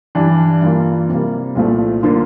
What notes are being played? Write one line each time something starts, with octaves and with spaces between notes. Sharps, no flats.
G2 E3 G3 D4
G2 E3 A#3 F4
C3 G3 A#3
C2 A#2 F3 A3
D3 F3 A#3 F4